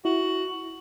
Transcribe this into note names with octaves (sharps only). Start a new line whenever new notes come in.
E4 F#4